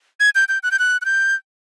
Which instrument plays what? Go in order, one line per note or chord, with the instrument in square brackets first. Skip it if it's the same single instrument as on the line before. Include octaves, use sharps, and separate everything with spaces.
[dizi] G#6
G6
G6
F#6
G6
F#6
F#6
G6